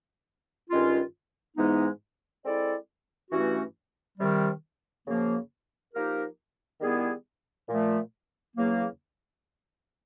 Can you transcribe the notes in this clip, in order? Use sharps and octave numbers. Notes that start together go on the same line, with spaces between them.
G2 D#3 G#3 C#4 F4
G#2 E3 G#3 B3 D#4
G#3 C4 E4 A4 D5
G2 E3 A3 C#4 F#4
C3 D#3 G3
F#2 C#3 F3 A#3
F3 A#3 D#4 G4 A#4
D#3 G3 B3 E4 G#4
A#2 F3 A3
E2 C#3 F#3 A#3